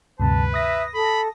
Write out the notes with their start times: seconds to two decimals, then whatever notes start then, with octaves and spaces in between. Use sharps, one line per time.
0.20 D2 G2 C3 B4 A5
0.54 E5 D#6 A#6
0.94 A4 B5